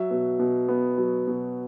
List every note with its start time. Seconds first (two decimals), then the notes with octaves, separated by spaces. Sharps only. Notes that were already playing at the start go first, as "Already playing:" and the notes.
Already playing: F#3 E5
0.11 B2
0.40 B2
0.68 B3
0.98 F#3
1.27 B2